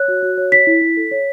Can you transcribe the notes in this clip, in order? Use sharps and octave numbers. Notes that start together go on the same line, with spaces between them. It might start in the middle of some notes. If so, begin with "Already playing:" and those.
Already playing: C#5 F#6
F#4
F#4
C#5
C#5 B6
E4
E4
A4
C#5